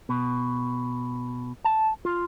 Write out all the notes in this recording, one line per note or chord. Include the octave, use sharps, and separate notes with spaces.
B2
A5
F4